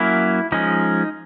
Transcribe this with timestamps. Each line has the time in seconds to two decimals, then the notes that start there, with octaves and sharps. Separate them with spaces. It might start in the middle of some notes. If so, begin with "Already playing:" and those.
Already playing: F#3 A#3 C#4 E4
0.52 F3 G#3 C#4 D#4